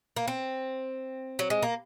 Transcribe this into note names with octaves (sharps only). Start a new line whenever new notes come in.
A#3
C4
F#3
G#3
A#3